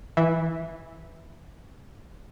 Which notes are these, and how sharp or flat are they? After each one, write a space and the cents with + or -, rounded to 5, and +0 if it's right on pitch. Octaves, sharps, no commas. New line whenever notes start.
E3 +0 E5 -10